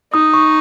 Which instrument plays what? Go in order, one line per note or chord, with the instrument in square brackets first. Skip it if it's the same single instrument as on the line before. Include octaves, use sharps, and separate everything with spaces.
[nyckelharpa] D#4 [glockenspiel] D#6
[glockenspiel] C#6